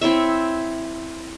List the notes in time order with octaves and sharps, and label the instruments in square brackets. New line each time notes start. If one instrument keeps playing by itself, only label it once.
[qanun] C4 E4 C#5 E5